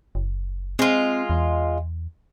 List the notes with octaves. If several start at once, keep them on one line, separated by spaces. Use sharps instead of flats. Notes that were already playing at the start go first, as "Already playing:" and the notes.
F#1
G#3 C4 F4
E2